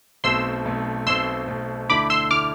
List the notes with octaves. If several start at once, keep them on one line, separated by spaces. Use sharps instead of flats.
B1 B2 A3 C4 C6 E6
B1 B2 A3 C4
B1 B2 A3 C4 C6 E6
B1 B2 A3 C4
D2 D3 A3 E4 A4 B5 D6
C6 E6
D3 A3 E4 A4 D6 F6